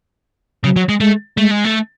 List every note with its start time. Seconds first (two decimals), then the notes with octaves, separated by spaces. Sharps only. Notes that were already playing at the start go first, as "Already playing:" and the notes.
0.64 C#3 F#3
0.76 F#3
0.89 G#3
1.00 G#3 A3
1.37 G#3 A3
1.51 G#3
1.64 A3